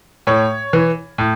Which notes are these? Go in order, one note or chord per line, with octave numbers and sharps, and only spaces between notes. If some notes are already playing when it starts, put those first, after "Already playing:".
A2 C#5
E3
A2